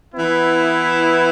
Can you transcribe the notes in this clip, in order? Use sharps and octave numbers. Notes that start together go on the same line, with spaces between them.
E3 B3 E4